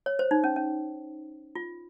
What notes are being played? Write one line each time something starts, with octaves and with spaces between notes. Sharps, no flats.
C#5
C5
D#4
C#4
C#4
F4